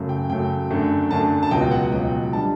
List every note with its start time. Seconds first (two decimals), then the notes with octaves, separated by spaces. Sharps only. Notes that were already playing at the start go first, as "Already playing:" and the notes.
Already playing: F#2 C#3 F#3 A3
0.09 G5
0.29 F#2 C#3 F#3 A3 G5
0.71 F#2 D3 A3
1.11 F#2 D3 A3 A5
1.43 A5
1.51 C#2 B2 F#3 G5
1.71 F#5
1.92 C#2 B2 F#3 G5
2.33 D3 G3 A5